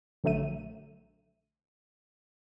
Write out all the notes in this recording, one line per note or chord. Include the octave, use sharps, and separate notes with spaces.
A#1 D3 F#3 A3 D#7